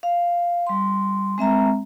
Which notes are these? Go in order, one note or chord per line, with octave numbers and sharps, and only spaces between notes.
F5
G3 C6
G#3 C4 E5 A#5